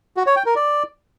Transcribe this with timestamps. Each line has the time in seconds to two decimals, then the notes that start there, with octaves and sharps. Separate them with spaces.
0.17 F#4
0.26 C#5
0.36 G5
0.46 A#4
0.56 D5